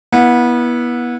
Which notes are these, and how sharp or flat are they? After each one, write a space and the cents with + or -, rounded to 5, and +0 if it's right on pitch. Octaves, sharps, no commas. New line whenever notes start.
B3 -25 E4 -5